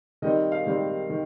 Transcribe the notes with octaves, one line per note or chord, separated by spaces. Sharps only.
D#3 G3 C4 D#4 D#5
F5
D#3 G3 C4 D#4
D#3